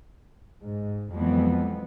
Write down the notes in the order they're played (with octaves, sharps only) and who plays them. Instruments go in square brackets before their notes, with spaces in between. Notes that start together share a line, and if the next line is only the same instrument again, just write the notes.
[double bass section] G#2
[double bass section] F2 B3 [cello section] E3 F#3 G#3